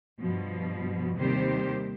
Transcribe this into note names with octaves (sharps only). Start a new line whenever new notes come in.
G2 B2 F3
D#2 C3 D#3 G3 G4 C5